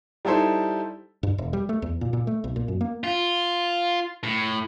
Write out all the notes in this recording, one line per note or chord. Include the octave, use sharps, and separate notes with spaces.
G3 D#4 E4 A4 C5
G2
E1
G3
A3
E2
A#2
A#2
A3
B1
A#2
F#2
A#3
F4
A2